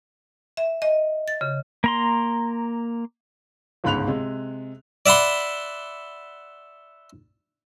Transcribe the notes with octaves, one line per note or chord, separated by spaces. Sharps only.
E5
D#5
A6
C#3
A#3 A#5 C6
G1 C#2 G#2 B5 F#6 F7
C3 G#3
D5 E5 F#5 B5 C6